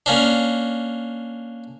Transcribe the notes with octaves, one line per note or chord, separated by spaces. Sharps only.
A#3 C#4 D4